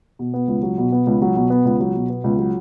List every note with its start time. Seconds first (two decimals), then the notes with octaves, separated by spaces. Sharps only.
0.19 B2
0.34 B3
0.48 C#2
0.63 F#3
0.78 B2
0.92 B3
1.07 C#2
1.22 F#3
1.36 B2
1.50 B3
1.65 C#2
1.80 F#3
1.95 B2
2.10 B3
2.24 C#2
2.39 F#3